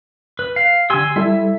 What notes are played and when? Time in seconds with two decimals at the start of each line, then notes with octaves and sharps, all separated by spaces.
0.39 B4
0.56 F5
0.90 D3 G4 G#5 C6 E6
1.16 G3 E4 A4 E5